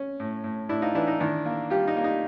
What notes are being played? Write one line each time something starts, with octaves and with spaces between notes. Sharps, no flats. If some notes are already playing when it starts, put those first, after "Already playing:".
Already playing: C#4
A2
A2
A2 D4 E4
D#4 F4
E3 D4 E4
D#4
D#3 D4 E4
A#3
G3 F4 G4
D#4
A#3
D#4